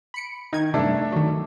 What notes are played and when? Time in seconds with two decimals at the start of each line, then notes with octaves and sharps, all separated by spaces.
0.14 B5 C#7 D7
0.53 D#3 D#4 G#6
0.74 G2 C3 A3 D4 A4
1.12 D#3 F#3